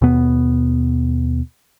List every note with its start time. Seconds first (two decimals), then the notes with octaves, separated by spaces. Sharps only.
0.02 D#2 B2 B3